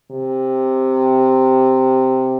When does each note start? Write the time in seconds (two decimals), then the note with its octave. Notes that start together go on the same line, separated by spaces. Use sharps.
0.11 C3